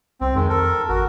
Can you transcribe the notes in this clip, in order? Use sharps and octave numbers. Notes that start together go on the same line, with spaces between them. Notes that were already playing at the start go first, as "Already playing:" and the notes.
C2 C4
F2 D#3 G#3
A4 A#4
G#1 F#4 A#4